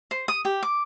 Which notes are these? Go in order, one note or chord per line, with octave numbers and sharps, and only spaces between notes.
C5
D#6
G4
D6